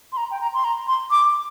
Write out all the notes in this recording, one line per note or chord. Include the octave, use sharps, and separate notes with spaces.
C6
A#5
G5
A#5
C6
A#5
C6
D6